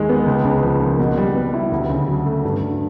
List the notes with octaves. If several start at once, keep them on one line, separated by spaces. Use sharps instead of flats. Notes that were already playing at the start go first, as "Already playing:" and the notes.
Already playing: D#2 D#3 G#3
B3
C#2
C#3
F3
A#3
B2
G3
B3
E4
D2
C#3
F#3
A3
G2
D3